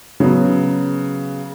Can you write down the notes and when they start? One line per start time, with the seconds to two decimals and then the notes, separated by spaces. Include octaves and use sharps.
0.20 C#3 F#3 B3